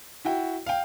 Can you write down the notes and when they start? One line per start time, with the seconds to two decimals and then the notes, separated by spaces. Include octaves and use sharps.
0.25 E4 F#4 G5
0.66 F5 G5